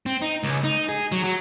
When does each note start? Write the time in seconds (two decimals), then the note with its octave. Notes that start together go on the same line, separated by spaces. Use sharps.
0.06 C4
0.22 D#4
0.43 C#2
0.64 D#4
0.89 G#4
1.12 F#3
1.24 F#3